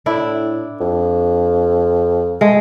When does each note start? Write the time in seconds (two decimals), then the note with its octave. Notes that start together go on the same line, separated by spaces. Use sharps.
0.06 A2 D4 E4
0.80 F2
2.41 G#3 A3